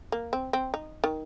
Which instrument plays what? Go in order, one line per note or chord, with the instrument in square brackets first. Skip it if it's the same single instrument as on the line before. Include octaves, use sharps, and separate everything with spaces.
[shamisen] A#3
C4
C4
D#4
D#3